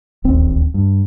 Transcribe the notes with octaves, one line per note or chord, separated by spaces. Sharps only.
D1 A1 D#2 C4
G2